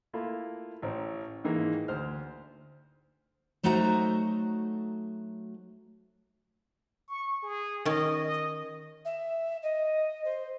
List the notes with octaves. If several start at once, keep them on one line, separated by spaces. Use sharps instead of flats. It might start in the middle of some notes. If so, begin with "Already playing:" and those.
A3 A#3 E4 F4
A1 C#4 C5
G#2 D#3 E3 G#3 A#3
D2 C5 F6
F#3 A3 D#4 F#4 C5 A#5
C#6
G#4
D#3 C#4 D#5
D#5
E5
D#5
C5